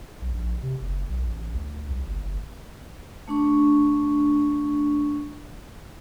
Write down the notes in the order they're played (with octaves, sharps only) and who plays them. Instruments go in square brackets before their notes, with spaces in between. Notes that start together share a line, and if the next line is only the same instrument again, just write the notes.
[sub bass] B1
A#1
C3
F#1
B1
A1
D2
C2
G1
G1
[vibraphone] A3 D4 C#6